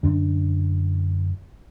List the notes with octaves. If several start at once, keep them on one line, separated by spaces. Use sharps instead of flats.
F#2 D3 D4